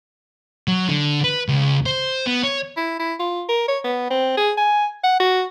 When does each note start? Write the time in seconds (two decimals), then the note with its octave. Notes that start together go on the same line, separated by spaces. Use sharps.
0.68 F#3
0.88 D3
1.24 B4
1.48 C#2
1.86 C5
2.26 B3
2.43 C#5
2.77 E4
2.99 E4
3.19 F4
3.49 A#4
3.68 C#5
3.84 B3
4.10 C4
4.37 G#4
4.57 G#5
5.03 F#5
5.20 F#4